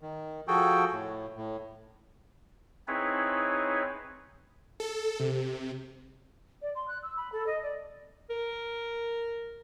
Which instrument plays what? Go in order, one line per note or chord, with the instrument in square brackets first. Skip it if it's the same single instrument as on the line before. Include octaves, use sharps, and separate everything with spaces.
[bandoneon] D#3
F3 F#4 G#4 A4 G5
A2
A2
[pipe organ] C4 D#4 E4 G#4 B4 C#5
[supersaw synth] A4
C3
[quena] D5
C6
F#6
E6
B5
A4
D#5
D5
[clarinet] A#4